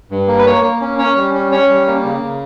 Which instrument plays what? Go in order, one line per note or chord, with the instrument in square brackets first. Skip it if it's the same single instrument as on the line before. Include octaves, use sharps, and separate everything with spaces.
[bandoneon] G2
A#3
B4
A#3 C#5
A#3
C#4
C#4 C#5
G3
C#4
C#4 C#5
G3
A#3
C#3
C#3